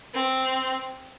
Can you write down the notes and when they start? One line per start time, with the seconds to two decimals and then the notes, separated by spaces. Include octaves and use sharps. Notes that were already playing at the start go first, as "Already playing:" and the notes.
0.14 C4